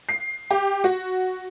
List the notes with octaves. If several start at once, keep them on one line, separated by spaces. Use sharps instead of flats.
C7
G4
F#4